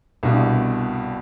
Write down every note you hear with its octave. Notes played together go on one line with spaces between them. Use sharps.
C2 G2 B2